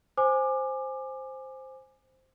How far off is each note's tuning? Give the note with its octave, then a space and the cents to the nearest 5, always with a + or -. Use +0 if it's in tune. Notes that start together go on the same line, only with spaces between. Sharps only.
C5 +0 G#5 +0 D6 +25